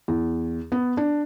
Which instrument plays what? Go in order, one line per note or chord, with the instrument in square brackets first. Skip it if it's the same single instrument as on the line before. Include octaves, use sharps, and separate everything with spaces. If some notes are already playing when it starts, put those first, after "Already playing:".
[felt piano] E2
B3
D4